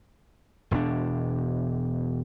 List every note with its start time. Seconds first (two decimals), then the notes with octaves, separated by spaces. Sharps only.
0.71 E1 B2 C4 D4